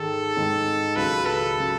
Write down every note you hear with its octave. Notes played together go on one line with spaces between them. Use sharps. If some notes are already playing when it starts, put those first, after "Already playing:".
Already playing: G#2 D#3 G#3 A4
G#2 D#3 G#3
C#2 C#3 F#3 B4
A4
C#3 F#3